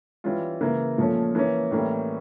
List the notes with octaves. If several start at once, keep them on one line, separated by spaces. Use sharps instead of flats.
E3 G3 C#4 F4
C#3 E3 A#3
A#2 F3 A3 C#4
E3 A#3 C#4
A2 E3 G3 A#3 C#4